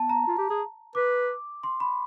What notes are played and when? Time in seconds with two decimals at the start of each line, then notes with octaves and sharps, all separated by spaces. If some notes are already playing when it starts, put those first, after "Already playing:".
Already playing: B3 A5
0.09 A#5
0.27 F4
0.38 G4
0.50 G#4
0.95 B4 D6
1.63 C6
1.80 B5